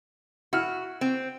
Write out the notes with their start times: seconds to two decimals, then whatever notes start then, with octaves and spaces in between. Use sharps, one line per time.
0.53 E4 F#4 F6
1.01 C4